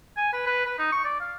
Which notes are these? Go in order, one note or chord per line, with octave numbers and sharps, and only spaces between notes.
G#5
B4
B4
B4
D#4
C#6
D5
F5